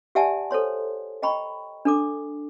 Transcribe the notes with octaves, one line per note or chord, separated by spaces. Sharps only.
G4 D5 E5 F#5 G#5 A5
A4 C5 C#5 C6
D#5 G5 A#5 B5 C#6
D4 A4 D6